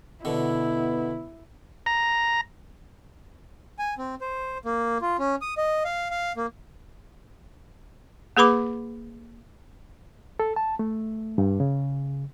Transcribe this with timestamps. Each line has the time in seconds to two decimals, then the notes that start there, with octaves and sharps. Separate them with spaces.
0.25 B2 D3 B3 E4
1.86 A#5
3.79 G#5
3.98 C4
4.21 C5
4.65 A#3
5.02 F4
5.19 C#4
5.42 D#6
5.57 D#5
5.85 F5
6.11 F5
6.37 A#3
8.37 A#3 G#4 B4 B5 D6
10.40 A4
10.56 A5
10.79 A3
11.38 G2
11.60 C#3